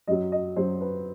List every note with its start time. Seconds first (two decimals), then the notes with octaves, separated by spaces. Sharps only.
0.07 F#2 F#3 D#5
0.32 D#5
0.56 F#2 F#3 C5
0.81 B4